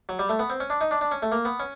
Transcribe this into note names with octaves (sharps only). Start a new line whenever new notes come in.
F#3
G3
A3
B3
C4
C#4
D4
D#4
D4
D4
C#4
A3
A#3
B3
C#4